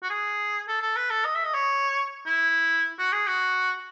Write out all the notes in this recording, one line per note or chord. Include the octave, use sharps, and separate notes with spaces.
F#4
G#4
A4
A4
B4
A4
D#5
E5
D#5
C#5
E4
F#4
G#4
F#4